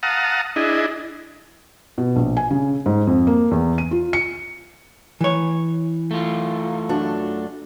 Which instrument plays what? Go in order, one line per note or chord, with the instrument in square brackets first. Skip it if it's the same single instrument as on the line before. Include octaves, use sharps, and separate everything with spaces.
[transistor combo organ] F5 F#5 A5 A#5 D#6
D4 E4 G#4 D#5
[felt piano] B2
A#1
G#5
C#3
G#2
F2
A#3
E2
D#7
F4
C#7
[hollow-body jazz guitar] E3 C#5
[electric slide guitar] A3 F4
[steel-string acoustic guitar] F#2 D4 F#4